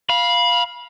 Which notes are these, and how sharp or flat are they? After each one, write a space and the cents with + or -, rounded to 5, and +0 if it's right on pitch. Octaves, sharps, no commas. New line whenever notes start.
F5 +0 B5 -25